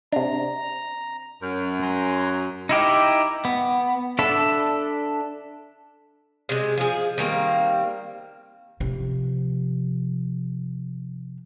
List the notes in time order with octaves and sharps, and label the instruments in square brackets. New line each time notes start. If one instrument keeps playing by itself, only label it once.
[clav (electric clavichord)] C3 D4 [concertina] A#5
[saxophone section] F#2 [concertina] F6
[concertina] G#5 A#5 C6
[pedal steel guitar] D#4 E4 G4 A#4
B3
D4 A4 E5 B5
[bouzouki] C3 G#3
F3 G#4
D#3 G3 A#3 C4
[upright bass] C3 F3